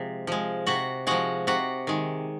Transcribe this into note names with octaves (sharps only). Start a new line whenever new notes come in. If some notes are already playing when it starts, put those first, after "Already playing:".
Already playing: C3 F3 G#3
F3 G#3
C3 F#4 F#5
F3 G#3 F#4 F#5
C3 F#4 F#5
D#3 G#3